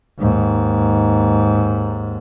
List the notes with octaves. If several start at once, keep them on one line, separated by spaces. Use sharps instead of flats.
D#2 G#2